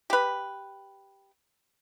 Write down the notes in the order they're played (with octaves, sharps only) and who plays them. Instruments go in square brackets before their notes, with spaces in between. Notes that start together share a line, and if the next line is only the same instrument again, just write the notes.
[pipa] G4 B4